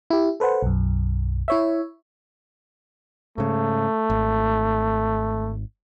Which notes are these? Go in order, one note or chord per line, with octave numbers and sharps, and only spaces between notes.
E4 G4
A4 B4 C5 F#5
B1 F#2
E4 C#5 E5
G#2 C#3 A3
G#1